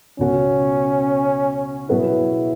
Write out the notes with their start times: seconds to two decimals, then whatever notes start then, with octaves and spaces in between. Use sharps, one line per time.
0.19 C#2 B2 B3 C#4 F#4
1.89 B2 F#3 B3 E4 G#4 B4